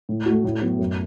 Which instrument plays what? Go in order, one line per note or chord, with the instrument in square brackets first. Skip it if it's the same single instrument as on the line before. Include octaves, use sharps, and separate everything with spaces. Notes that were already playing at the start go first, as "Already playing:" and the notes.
[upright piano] A2
A3 F#4
A2
F#3 B3
F#2